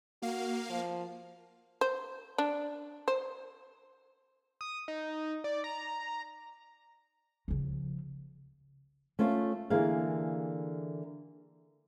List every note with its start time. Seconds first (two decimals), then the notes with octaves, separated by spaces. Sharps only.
0.22 A#3 F#4 F5
0.70 F3
1.81 C5
2.38 D4
3.08 C5
4.61 D#6
4.88 D#4
5.44 D5
5.64 A#5
7.48 C#3 F3
9.19 A3 C#4 F4
9.70 D3 E3 A#3 G4 G#4 F5